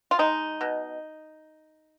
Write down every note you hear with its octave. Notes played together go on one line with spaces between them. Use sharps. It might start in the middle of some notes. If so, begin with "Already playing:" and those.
F4
G#3 D#4
B2